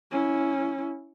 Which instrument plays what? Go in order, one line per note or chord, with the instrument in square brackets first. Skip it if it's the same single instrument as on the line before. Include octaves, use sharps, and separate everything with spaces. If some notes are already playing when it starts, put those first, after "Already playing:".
[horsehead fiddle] C#4 E4